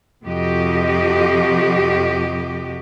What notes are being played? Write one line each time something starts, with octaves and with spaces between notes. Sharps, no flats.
F2 C3 F3 F#4 G4 D#5